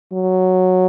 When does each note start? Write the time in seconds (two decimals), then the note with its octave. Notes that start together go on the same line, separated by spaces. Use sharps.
0.13 F#3